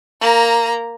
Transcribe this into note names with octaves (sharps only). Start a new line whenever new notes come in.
A#3 A#5